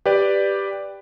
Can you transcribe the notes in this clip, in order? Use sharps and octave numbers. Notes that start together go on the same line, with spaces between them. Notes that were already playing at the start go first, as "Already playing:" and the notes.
G4 B4 D5